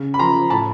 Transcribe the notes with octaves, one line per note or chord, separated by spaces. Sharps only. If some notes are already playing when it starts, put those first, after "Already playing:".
Already playing: C#3
B5
F3 A#5 C6
A2 A5 B5